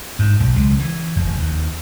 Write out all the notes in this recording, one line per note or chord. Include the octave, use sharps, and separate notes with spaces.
G#2
B1
C#2
E3
F1
D#2